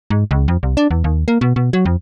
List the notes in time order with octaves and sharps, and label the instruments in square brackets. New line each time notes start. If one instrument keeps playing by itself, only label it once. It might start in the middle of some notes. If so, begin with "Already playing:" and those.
[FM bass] G#2
C#2
F2
C2
D4
E2
D#2
A#3
B2
B2
F#3
F2